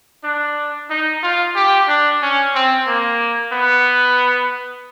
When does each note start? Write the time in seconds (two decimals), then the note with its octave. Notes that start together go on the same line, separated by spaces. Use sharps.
0.24 D4
0.90 D#4
1.23 F4
1.56 G4
1.88 D4
2.22 C#4
2.55 C4
2.87 A#3
3.53 B3